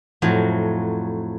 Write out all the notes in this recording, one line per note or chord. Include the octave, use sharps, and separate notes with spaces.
F2 A2 F#3